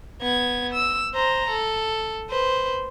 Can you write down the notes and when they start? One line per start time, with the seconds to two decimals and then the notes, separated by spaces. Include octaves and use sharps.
0.22 B3 G#6
0.74 E6
1.14 C5 A#5
1.50 A4
2.30 B4 C5